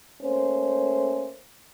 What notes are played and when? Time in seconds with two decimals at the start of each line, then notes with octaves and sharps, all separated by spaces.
0.22 A3 A#3 C#4 C5